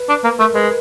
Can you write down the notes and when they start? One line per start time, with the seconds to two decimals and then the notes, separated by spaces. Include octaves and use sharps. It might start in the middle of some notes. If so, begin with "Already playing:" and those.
Already playing: B4
0.09 D4
0.24 A#3
0.39 A3 A#4
0.55 G#3 B4